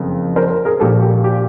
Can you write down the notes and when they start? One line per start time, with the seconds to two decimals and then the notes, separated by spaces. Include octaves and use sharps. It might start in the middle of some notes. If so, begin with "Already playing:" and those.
Already playing: F#1 F2
0.36 A#4 C5
0.50 A#4 C5
0.65 G#4 A#4
0.80 A#1 A#2 F3 G4 A4
1.02 G4
1.24 G4